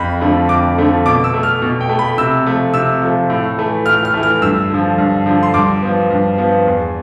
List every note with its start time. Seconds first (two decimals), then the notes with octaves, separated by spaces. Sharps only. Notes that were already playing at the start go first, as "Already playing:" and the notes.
Already playing: F2 B5
0.21 D3 F3 A3
0.49 F2 D6
0.78 D3 F3 A3
1.06 B2 D6
1.24 E6
1.34 A3
1.43 F6
1.62 B2
1.81 G5
1.89 A3
1.99 B5
2.18 C3 E6
2.46 F3 A3
2.74 C3 E6
3.02 F3 A3
3.30 A2
3.58 E3 A3
3.86 A2 F6
4.05 F6
4.14 E3 A3
4.23 F6
4.42 G2 E6
4.70 D3 F3
4.98 G2
5.26 D3 F3
5.43 C6
5.54 G2 D6
5.82 F3 B3
6.10 G2
6.38 F3 B3
6.65 E2